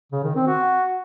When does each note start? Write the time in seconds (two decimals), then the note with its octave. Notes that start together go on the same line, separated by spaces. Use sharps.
0.12 C#3
0.24 D#3
0.35 C4
0.47 F#4